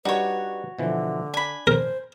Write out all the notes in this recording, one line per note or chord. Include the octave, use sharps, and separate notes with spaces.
G3 D4 D#4 F#4 B4 C#5
B2 D3 E3 F3
D4 G#5 B5
A#4 C5